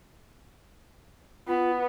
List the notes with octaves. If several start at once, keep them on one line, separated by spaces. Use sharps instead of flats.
B3 F4